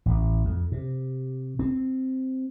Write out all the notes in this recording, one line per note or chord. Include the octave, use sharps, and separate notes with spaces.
A1
F2
C3
C4